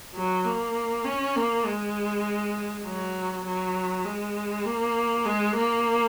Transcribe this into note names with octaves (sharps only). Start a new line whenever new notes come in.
F#3
A#3
C#4
A#3
G#3
F#3
F#3
G#3
A#3
G#3
A#3